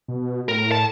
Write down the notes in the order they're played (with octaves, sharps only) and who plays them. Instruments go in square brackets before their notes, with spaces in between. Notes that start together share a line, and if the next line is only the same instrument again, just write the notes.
[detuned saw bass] B2
[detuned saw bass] A2 [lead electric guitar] A#4
[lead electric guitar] A5